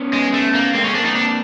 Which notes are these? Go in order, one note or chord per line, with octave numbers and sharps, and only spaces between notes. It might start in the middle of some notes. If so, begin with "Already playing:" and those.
Already playing: B3 C#4
G#3
A3
A#3
G#3 A#3 C4
C#4
A#3 C4 D4
D#4
D4